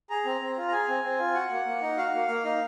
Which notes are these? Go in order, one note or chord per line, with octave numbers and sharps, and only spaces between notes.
G#4 A#5
C4
C4
F4
A#5
G#4 G#5
C4
C4
F4
F#4 F#5
A#3
A#3
D#4
F#4 F5
A#3
A#3
D#4